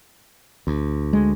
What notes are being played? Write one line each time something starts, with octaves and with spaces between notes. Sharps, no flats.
D2
G#3